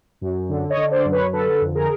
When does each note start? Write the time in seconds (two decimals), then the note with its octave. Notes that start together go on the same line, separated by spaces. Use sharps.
0.21 F#2
0.49 D3
0.70 C#5 D#5
0.77 D3
0.91 C5 D5
1.05 F#2
1.12 B4 C#5
1.33 D3 A4 B4
1.61 F2
1.75 G#4 A#4